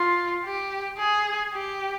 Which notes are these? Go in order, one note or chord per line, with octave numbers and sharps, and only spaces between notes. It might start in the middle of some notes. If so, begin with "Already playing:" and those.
Already playing: F4
G4
G#4
G4